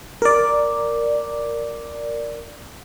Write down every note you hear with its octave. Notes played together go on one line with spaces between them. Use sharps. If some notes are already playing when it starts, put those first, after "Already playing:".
A#4 D5